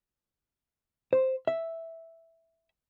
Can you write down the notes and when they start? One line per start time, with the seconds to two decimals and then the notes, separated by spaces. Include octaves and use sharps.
1.13 C5
1.47 E5